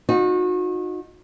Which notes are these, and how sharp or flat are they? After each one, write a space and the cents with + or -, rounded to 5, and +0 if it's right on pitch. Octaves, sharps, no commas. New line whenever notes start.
D#4 +0 F#4 -35